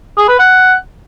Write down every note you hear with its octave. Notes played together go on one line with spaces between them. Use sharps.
G#4
B4
F#5